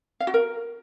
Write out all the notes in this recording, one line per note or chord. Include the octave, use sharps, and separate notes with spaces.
F5
F#4
A#4